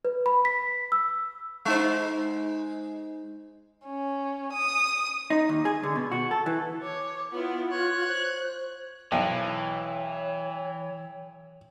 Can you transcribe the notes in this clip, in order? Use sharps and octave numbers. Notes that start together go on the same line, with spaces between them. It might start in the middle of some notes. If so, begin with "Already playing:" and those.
B4
B5
B6
E6
G#3 D#4 C5
C#4
D#6
D#4
D#2
G#4
D3
B2
F#4
A4
E3
C#5 D6
B3 E4 F4
C#5 F#6
C5
B1 E3 C#5 G5